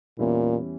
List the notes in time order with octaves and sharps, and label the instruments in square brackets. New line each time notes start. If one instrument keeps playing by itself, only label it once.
[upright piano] E2 E3 G3 C#4 E4 [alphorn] A#2